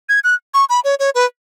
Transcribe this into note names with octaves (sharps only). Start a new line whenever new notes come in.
G#6
F#6
C#6
B5
C#5
C#5
B4